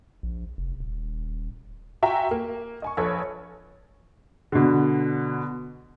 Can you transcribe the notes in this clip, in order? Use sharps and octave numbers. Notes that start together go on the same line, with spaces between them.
A#1
F1
D#1
F4 F#4 E5 G5 G#5 A#5
A#3
D#5 G#5 C#6
A#1 A4 B4 C#5
B2 D3